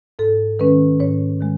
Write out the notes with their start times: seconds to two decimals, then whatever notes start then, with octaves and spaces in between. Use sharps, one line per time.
0.19 G#2 A4
0.59 D#3 G#3 C#4 B4
1.00 G#2 C#5
1.40 D#3 G#3